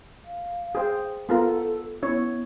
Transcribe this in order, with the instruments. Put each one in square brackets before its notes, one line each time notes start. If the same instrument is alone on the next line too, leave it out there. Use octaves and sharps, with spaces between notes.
[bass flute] F5
[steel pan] G#4 C5 G5
[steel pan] B3 F4 A#4 [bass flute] A4
[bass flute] B3 [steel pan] C#4 E4 C#5